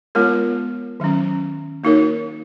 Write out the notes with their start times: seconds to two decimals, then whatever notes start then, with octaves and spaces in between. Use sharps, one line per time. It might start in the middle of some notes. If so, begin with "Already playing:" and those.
0.15 G#3 B3 F4 A#4 C#5
1.00 D#3 F#3 C#4
1.84 A#3 D#4 F#4 A#4 C#5